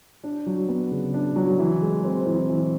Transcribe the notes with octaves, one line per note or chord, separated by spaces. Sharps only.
D4
F#3
B3
C#3
D4
F#3
E3
G#3
C4
E3
E3